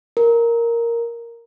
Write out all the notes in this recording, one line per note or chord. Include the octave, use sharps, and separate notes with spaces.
A#4